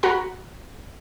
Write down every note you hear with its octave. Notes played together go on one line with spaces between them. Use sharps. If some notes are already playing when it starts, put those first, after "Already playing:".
F#4 F#5 A#5 B5